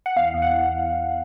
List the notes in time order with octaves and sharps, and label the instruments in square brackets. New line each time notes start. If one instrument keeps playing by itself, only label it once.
[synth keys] F#5
E2 F5
E2
F#5